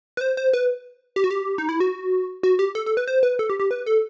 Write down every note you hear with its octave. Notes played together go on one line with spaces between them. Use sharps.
B4
C5
C5
B4
G4
F#4
G4
D#4
E4
F#4
F#4
G4
A4
A4
B4
C5
B4
A4
G4
G4
B4
A4